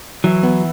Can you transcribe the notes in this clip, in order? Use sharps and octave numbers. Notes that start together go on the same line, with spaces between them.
E3 F#3
B3